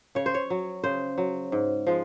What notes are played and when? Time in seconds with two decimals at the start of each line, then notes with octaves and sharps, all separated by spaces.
0.15 C#3 C#5
0.26 C5
0.34 C#5
0.50 F#3
0.84 C#3 C5
1.18 F#3
1.52 G#2
1.87 F3 G#3